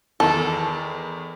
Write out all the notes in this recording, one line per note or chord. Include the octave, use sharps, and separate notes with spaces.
E2 D#3 A4